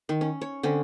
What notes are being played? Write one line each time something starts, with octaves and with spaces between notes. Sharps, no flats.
D#3
C#4
C#5
D3 C4 C#4